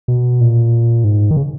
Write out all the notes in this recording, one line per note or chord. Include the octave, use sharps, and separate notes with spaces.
B2
A#2
G#2
D#3
C#3